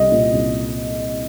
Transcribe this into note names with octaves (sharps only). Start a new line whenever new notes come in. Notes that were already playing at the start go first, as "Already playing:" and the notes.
Already playing: C2 G3 D#5
A#2
C2